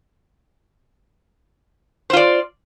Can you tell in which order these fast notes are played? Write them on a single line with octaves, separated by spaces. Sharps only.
C5 F4 D5